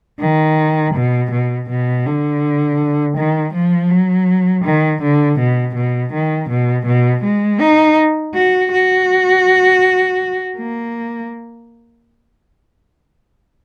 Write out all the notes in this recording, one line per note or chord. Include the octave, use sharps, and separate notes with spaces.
D#3
B2
B2
B2
D3
D#3
F3
F#3
D#3
D3
B2
B2
D#3
B2
B2
G#3
D#4
F#4
F#4
A#3